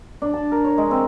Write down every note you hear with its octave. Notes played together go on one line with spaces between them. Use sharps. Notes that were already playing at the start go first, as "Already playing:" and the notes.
D4
A5
A#4
C#5
G#3
C4